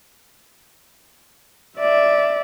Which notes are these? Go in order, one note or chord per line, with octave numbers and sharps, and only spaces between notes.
D5 E5